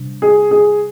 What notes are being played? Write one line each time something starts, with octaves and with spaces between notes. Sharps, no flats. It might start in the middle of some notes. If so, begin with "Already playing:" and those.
Already playing: C3 G3 D4
G#4
G#4